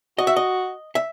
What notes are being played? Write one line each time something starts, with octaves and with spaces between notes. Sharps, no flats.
F#4 D#5
E5
D#5
E5